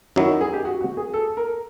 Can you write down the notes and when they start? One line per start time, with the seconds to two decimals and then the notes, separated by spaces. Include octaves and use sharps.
0.16 F#2 D#3 F#3 E4
0.29 D#4
0.41 G#4
0.53 G4
0.65 F#4
0.81 F#4
0.97 G#4
1.14 A4
1.37 A#4